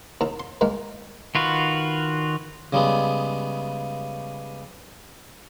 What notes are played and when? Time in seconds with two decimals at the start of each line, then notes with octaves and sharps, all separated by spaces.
0.21 D#2 A#5
0.40 C6
0.61 D#3 G#3 A#3
1.35 D#3 F4 F#4 B4
2.73 C#3 G3 G#3 B3